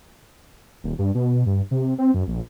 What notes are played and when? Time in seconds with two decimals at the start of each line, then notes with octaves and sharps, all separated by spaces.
0.84 D#1
0.99 G2
1.15 B2
1.46 G2
1.71 C3
1.99 C4
2.14 F#2
2.28 A#1